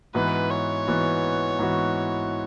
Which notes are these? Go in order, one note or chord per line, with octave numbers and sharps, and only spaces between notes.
G#2 E3 B3 F#4 B4
C#5
G#2 E3 B3 F#4
G#2 E3 B3 F#4